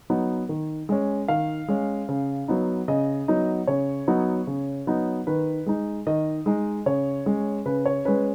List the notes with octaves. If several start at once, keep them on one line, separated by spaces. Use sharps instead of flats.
F#3 B3 D#4
D#3
G#3 C#4
D#3 F5
G#3 C#4
C#3
F#3 B3 D#4
C#3 D#5
F#3 B3 D#4
C#3 C#5
F#3 B3 D#4
C#3
F#3 B3 D#4
D#3 B4
G#3 D#4
D#3 D#5
G#3 D#4
C#3 C#5
G#3 C#4
C#3 B4
C#5
G#3 C#4 B4